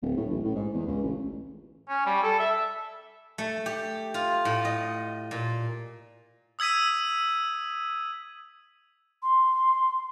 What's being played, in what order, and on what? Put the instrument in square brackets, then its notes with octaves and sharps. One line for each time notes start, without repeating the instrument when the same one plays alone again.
[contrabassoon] D1
A2
A1
A2
G#2
E2
C#2
A1
[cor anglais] C#4
G3
A4
E5
[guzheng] A3
G4
F4
A2
D#5
A#2
[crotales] D#6 E6 G#6 B6 D#7
[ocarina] C6